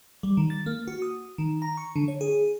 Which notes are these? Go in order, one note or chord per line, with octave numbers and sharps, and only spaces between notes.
G3
D#3
A6
A#3
F#4
D#6
D#3
A#5
C#6
D3
C#5
G#4